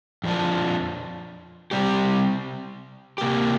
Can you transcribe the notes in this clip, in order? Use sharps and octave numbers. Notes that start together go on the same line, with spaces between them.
F2 F3 D4
C3 G3 C4 G4
C3 A#3 G4